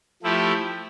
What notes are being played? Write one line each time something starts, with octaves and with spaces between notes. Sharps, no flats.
F3 A3 E4 G4